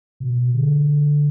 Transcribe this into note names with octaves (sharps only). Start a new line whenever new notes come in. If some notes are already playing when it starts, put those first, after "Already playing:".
B2
D3